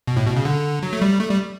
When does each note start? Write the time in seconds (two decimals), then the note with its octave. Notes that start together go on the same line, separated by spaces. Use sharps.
0.08 B2
0.17 A2
0.26 B2
0.36 C#3
0.45 D3
0.82 F#3
0.93 A3
1.02 G3
1.20 A3
1.30 G3